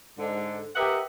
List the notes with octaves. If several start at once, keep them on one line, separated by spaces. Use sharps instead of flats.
G#2 D3
G4 A#4 B4 D#5 E5 F#5